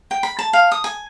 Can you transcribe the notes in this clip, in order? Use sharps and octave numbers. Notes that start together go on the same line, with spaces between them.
G5
B5
A5
F5
D#6
G#5